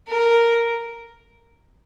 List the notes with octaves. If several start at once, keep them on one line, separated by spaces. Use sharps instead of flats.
A#4